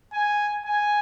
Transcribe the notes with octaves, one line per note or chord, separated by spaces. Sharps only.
G#5
G#5